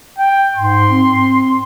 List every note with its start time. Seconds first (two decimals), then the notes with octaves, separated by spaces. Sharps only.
0.18 G5
0.56 G#2 C6
0.90 C4